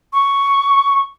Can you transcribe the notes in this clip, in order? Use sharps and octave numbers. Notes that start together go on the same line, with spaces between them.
C#6